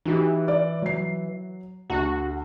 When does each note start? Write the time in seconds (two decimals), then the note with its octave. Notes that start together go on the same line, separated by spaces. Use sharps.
0.06 E3 D#4 F#4 G4
0.48 D5
0.82 F#3 C7
1.90 D2 F#4